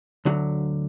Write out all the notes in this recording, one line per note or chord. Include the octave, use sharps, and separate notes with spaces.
D2 D3 F#3